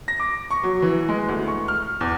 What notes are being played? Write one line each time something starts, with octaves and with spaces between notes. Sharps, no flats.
A#6
D6
C#6
F#3
E3
G#3
D2
C#6
F6
E2